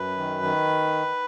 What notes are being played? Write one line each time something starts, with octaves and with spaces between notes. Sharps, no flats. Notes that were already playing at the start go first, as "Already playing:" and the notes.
Already playing: F#2 B4
D#3
D#3